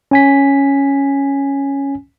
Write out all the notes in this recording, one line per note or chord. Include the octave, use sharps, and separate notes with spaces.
C#4 G#5 B6